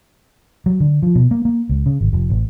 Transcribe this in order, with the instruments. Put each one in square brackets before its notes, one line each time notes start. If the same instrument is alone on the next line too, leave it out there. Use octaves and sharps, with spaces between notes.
[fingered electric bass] F#3
D3
F3
B2
A#3
A#3
C#2
C#3
G#1
F1
A1